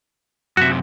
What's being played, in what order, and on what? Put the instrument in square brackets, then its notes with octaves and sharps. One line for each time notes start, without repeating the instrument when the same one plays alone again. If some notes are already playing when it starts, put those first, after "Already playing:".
[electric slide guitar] F#2 C3 [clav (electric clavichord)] F#4 E5